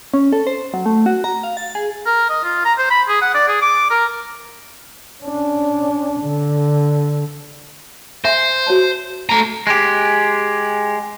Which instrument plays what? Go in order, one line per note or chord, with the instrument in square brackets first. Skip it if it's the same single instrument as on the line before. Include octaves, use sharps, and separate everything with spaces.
[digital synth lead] C#4
A4
C5
F#3
A3
F#4
A#5
F5
A6
G#4
[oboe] A#4
D#5
F4
A#5
C5
B5
G#4
F#5
D5
G#4
D6
A#4
[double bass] C#4 D4
D3
[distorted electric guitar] C5 [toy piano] E5 G#5 C6
[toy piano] F#4 C#5 A5
[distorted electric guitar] A3 A#5
[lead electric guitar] G#3 G4